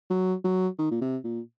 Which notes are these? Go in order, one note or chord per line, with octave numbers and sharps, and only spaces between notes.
F#3
F#3
D#3
A#2
C3
A#2